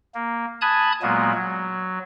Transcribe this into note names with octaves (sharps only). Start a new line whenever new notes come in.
A#3
G#5 A5 B5 D#6 F#6 G#6
A#2 F#3 G#3 A#3 B3
F#3